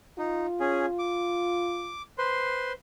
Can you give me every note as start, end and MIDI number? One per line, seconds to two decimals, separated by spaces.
0.18 0.46 63
0.18 1.93 65
0.60 0.86 61
0.60 0.86 68
0.99 2.02 86
2.18 2.72 71
2.18 2.72 72
2.18 2.72 84